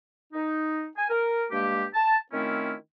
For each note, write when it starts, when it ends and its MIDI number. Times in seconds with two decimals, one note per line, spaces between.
0.33 0.87 63
0.97 1.07 80
1.10 1.45 70
1.51 1.85 43
1.51 1.85 56
1.51 1.85 58
1.51 1.85 67
1.94 2.18 81
2.33 2.73 51
2.33 2.73 57
2.33 2.73 60
2.33 2.73 61
2.33 2.73 64
2.33 2.73 65